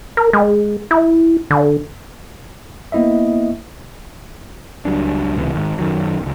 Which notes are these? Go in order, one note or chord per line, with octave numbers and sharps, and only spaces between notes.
A#4
G#3
E4
D3
A#3 B3 E4 D#5 E5
C#2 F#3 G3 D4
C#2 A2 C3 E3
G#2 D#3
F#2 D#3 F#3
D1 C#2